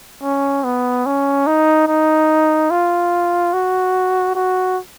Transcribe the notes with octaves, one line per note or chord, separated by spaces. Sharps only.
C#4
B3
C#4
D#4
D#4
F4
F#4
F#4